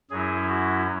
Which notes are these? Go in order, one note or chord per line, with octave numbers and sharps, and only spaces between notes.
F#2 F#3 C#4 E4 G#4
F#4